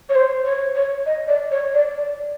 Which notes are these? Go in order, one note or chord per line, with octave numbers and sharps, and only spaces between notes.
C#5
C5
C#5
C#5
D#5
D5
C#5
D5
D5